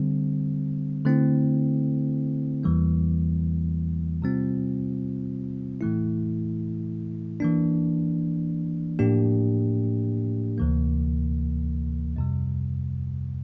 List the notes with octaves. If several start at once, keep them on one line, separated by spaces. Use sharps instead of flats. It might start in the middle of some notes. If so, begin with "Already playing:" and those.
Already playing: D3 G3 C4
D3 A3 C4 E4
E2 E3 G3 A#3
C3 G3 C4 F4
A2 E3 A3 E4
E3 A#3 D4
A2 F3 A#3 D4 G4
D2 C3 E3 A#3
F2 C3 G3